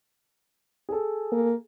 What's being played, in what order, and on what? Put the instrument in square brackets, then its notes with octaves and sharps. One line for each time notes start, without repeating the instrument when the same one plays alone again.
[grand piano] G#4 A4
[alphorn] A#3